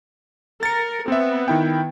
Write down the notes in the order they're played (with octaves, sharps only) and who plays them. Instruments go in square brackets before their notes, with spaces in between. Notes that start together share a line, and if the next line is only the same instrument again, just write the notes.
[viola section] A#4 [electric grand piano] A6 C#7
[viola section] B3 [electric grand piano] C4 E5
[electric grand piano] D#3 E4 G5